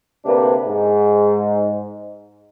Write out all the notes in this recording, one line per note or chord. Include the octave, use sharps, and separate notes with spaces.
D2 C3 A#3 D4 B4
G#2